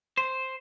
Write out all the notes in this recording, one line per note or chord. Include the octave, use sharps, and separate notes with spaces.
C5